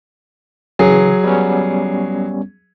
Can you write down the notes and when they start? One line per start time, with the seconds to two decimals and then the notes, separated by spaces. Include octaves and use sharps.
0.79 C#3 E3 F#3 G#4
1.24 G3 B3 C#4